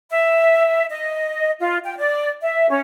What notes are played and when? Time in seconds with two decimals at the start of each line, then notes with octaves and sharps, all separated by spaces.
0.10 E5
0.90 D#5
1.60 F4
1.85 G5
1.97 D5
2.42 E5
2.69 C#4